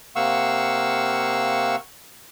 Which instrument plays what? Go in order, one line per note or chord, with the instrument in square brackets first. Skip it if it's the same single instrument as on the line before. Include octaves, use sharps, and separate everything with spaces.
[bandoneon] C3 A#3 F5 F#5 C#6 E6